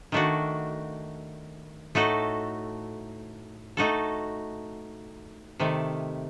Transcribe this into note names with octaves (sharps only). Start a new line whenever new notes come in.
D#3 A3 D4 F#4
A2 A3 D#4 F#4 A4
A3 D#4 F#4 A4
C3 D#3 A3